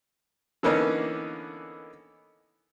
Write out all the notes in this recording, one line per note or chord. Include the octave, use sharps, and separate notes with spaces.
D3 E3 A#3 B3 C#4 D#4